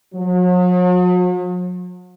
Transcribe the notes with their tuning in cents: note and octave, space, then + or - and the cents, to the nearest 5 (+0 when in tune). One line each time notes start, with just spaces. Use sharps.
F#3 -45